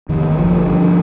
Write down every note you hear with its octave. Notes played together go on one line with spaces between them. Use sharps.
F2 D#3
G1
G1 F3
D3
G2